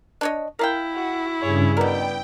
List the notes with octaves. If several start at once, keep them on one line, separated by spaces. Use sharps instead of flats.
D4 C#5 D#5
E4 A#4 F5 G5
F#4 F#5
G2 C#3 G#4 C#5
B2 B3 A#4 D5 G5